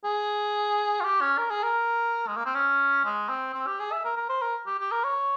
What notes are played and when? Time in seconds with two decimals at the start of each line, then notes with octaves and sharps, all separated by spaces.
0.05 G#4
1.01 F4
1.04 G4
1.21 C#4
1.38 A#4
1.51 G#4
1.63 A#4
2.27 G#3
2.37 A#3
2.46 C4
2.55 C#4
3.05 G#3
3.29 C4
3.55 C4
3.67 G4
3.80 G#4
3.92 E5
4.05 A#4
4.17 A#4
4.29 C5
4.42 A#4
4.67 G4
4.79 G4
4.92 A#4
5.04 C#5